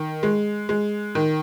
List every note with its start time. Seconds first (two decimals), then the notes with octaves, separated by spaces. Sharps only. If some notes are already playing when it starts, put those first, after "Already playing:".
Already playing: D#3
0.23 G#3
0.69 G#3
1.15 D#3